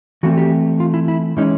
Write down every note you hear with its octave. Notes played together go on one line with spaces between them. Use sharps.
E3 A3 C4 F#4
G4
F4
E4
E4
E3 G#3 C#4 D#4